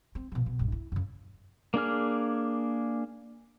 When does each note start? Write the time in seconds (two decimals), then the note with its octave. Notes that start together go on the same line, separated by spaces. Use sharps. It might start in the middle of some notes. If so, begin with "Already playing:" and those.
0.15 C4
0.32 B2 F3
0.46 B2
0.59 A#1 G2
0.72 E4
0.92 F#2 C#3
1.74 A#3 D4 G#4 F6